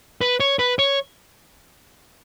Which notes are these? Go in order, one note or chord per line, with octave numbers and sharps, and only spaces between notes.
B4
C#5
B4
C#5